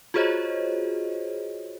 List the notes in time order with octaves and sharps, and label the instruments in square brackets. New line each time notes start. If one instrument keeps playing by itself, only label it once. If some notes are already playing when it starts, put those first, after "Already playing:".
[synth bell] F4 F#4 G#4 C5 C#5 D#5